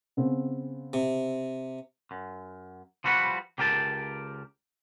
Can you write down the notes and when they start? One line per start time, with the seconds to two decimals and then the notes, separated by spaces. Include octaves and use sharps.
0.17 C#3 B3 C4
0.93 C3
2.11 F#2
3.04 F3 G3 F#4 B4 C5 F#5
3.58 C#2 G4 A#4 G5 A5